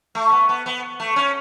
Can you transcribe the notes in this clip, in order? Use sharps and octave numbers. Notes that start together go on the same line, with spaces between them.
A3
B3
B3
B3
A3
C#4